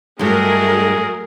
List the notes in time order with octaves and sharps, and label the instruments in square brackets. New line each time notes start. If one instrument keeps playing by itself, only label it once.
[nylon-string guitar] G2 G#3 [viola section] F#3 A3 A#4 [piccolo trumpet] G#4